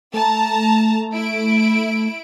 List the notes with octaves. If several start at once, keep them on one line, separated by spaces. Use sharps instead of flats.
A3 A5 A#5
E4 D7